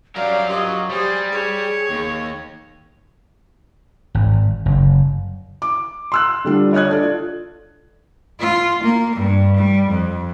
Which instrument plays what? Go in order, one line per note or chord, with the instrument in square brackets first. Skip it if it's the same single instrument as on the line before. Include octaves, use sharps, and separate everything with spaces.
[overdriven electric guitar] F#3 A#4 [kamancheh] G4 F5 [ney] D5
[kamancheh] F4 D#5 [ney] G4
[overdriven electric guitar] G3 [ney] G4 [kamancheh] G#4 C5
[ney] G#4 [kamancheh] C#5
[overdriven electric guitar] D#2
[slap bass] G#1
F#1
[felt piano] D6
C6 E6 F#6
D3 G3 D4 F4
C#5 D#5 D#6 F#6 G#6
D4 A4 D5
F4
[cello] F4
A#3
G2
G3
F2